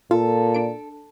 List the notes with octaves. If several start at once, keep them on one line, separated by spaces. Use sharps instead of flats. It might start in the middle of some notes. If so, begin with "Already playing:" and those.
A#2 F4 A4
D4 D7